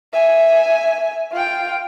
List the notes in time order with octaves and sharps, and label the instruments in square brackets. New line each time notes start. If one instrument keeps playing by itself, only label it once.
[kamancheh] E5 G#5
F4 G5